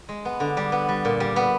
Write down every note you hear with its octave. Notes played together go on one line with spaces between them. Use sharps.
G#3
B3
D3
G3
B3
G3
A#2
G3
B3